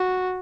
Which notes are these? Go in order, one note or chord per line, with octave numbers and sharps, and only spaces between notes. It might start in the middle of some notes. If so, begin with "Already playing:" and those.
Already playing: F#4